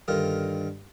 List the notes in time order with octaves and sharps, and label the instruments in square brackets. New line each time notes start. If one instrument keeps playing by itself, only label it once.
[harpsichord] G2 D3 D#3 D4 F4 A#4